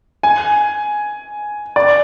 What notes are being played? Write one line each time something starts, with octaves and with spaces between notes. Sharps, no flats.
G#5
D5